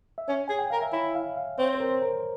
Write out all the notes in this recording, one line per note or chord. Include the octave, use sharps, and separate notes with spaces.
E5
C#4 C#5
G#4 G#5
G5
A#4 F5
E5
E4 C#5
F5
F5
C4 C#5
C5
A#4
A#4